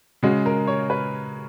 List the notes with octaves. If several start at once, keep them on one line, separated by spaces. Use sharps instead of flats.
C#3 G#3 F#4
A#4
C#5
B4